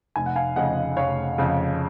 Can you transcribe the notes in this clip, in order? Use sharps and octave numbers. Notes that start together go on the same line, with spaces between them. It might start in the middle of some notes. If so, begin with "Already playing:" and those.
F1 G#5
F#5
F5 G#5
F2 C#3 D#5 F#5
F1 C#5 F5
F2 C#3